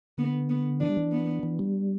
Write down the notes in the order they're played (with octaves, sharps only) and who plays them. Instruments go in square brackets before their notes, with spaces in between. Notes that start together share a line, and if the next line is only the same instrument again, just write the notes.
[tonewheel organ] D3 [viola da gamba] B3
[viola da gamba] B3
[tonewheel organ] E3 [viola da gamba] D4
[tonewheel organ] G3
E3
[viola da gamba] B3
[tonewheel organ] E3
G3